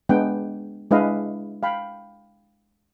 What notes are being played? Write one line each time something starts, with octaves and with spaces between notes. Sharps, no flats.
G#3 B3 D4 F#5 G5
G#3 D4 E4 B4 D#5 F5
F5 G5 B5